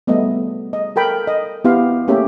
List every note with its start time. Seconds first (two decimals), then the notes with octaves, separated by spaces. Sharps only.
0.07 G3 A3 B3 D#5 E5
0.73 D#5
0.96 A4 A#4 G5 B5
1.27 D#5
1.65 B3 E4 G4 F5
2.08 A3 A#3 C#4 G4 C#5 E5